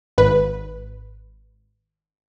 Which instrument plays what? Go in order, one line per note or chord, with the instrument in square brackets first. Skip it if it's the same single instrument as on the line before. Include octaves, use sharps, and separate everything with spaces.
[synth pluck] G#1 B4